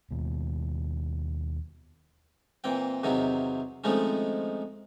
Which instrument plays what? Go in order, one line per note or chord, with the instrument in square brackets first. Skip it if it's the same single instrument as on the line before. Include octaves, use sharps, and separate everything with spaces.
[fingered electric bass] D#2 B2
[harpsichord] A#2 E3 C4 G5
E2 C3 D#3 F#3 C4 E4
D#3 F3 G#3 A3 C4 C#4